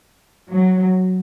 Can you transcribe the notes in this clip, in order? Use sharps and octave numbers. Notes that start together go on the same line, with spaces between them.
F#3